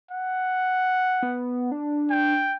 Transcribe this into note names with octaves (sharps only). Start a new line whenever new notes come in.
F#5
B3
D4
G5